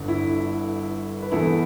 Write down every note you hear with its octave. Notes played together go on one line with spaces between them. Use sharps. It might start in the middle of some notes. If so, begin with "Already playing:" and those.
Already playing: G1 G2 D3
E4
B4
E1 E2 E3 E4 A4